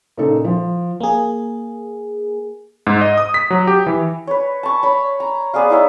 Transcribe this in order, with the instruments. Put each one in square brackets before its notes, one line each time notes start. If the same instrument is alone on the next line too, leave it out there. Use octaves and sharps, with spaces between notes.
[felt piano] A#2 C#3 D#4 A4
F3
[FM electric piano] A#3 G#4
[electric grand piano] G#2
D#5
D#6
B6
F#3
G4
E3
[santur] B4 C#5
A5 C#6
C#5 B5
A#5
B3 G#4 D5 F5
D#4 E4 C#5 E5